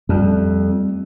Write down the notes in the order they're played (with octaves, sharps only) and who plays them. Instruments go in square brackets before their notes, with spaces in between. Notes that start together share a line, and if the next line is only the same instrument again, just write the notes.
[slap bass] F2 [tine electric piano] G3 A3